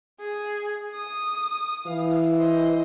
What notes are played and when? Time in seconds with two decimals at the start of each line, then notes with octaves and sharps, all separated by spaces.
0.20 G#4
0.94 D#6
1.87 E3 F5
2.38 C5 D#5